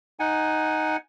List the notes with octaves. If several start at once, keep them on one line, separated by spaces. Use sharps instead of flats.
D#4 F#5 G#5